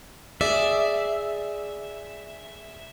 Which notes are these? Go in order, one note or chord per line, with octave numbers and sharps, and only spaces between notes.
G#4 D5 E5